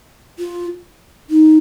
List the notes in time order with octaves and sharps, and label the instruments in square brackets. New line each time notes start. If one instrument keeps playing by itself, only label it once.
[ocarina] F4
D#4